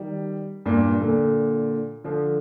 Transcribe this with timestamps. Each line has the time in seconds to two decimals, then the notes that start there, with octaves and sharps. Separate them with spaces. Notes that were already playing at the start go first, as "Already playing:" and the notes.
Already playing: D#3 G3
0.66 G2 A#2
1.01 A#2 D3
2.04 D3 F3